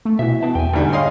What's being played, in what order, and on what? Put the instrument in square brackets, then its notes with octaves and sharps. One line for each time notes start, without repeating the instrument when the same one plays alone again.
[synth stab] A3
[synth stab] B2 E3 [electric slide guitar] E5
[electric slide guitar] B3 B4 A5
[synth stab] E2 [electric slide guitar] G5 G#5
[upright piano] D2 G#2 G3
[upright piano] C#5 D#5 F5 [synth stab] C6